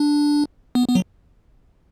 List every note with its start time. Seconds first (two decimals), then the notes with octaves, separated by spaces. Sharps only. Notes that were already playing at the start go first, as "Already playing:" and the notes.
Already playing: D4
0.75 B3
0.88 B3
0.95 F#3